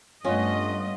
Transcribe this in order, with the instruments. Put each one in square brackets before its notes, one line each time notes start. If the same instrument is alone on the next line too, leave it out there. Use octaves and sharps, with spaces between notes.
[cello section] G2 A3 [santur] B3 F4 [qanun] C#4 [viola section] D#5